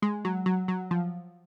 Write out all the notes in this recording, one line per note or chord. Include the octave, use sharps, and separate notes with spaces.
G#3
F#3
F#3
F#3
F3